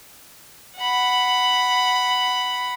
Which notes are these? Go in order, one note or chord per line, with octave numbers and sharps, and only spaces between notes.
F#5 B5